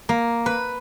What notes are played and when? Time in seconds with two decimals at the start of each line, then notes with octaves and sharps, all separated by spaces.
0.09 A#3
0.46 B4